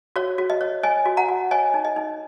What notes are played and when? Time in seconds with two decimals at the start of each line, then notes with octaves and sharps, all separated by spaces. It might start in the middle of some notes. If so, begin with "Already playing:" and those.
0.16 F#4 C#5
0.38 F#4
0.50 D#5
0.61 C#5
0.83 C#5 D#5 G#5
1.05 F#4
1.17 F#5 A#5
1.29 F#4
1.51 C#5 D#5 G#5
1.74 D#4
1.85 D#5
1.96 D#4